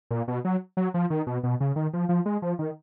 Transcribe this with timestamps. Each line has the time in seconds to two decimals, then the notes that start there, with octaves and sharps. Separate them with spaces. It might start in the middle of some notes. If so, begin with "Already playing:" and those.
0.11 A#2
0.28 B2
0.45 F#3
0.77 F#3
0.94 F3
1.10 D#3
1.27 B2
1.43 B2
1.60 C#3
1.76 D#3
1.93 F3
2.09 F3
2.26 G#3
2.42 F3
2.59 D#3